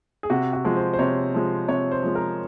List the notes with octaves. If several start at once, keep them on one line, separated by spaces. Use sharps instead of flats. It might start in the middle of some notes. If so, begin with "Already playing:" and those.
G#4
C3 F#4
F#4
F3 G#3
C5
C5
C3 C#5
F3 G#3
C3 C#5
C5
F3 G#3
A#4